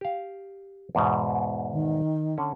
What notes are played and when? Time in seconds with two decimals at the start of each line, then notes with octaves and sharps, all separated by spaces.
0.01 G4 F5
0.95 E2 G#2 B2
1.72 D#3
2.38 D3 C#4